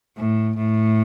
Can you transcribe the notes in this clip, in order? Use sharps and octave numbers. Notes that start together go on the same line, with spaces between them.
A2
A2